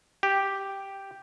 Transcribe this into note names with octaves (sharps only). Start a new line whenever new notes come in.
G4